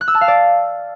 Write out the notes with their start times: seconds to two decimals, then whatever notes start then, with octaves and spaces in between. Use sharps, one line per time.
0.01 F#6
0.08 E6
0.14 A5
0.21 F5
0.28 D5